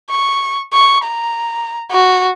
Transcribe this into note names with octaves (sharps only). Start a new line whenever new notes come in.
C#6
C#6
A#5
F#4